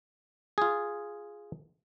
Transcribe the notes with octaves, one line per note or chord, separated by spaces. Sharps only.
F4 G#4